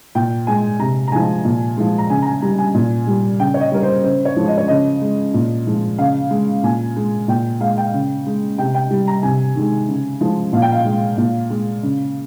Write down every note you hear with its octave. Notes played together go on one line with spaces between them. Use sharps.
A#2 G5
G#3 G#5
C3 A#5
A#5
F3 G#3 G#5
A#2
F3 G#3
A#5
C#3 G#5
A#5
G#5
G3 A#5
G#5
A#2
G3
C#3 G5
C#5
D#5
G3 A#4
C5
C#3 C5
C#5
F3 G#3
D#5
C#5
C#3 D#5
G#3
A#2
F3 G#3
C#3 F5
G#3
A#2 G#5
G#3
A#2 G5
G#3 F5
G5
C#3
G#3
C3 G5
G5
G3
A#5
C3 G#5
D#3 G#3
C#3
F3 G#3
A#2 F5
G5
F5
G#3
A#2
G#3
C#3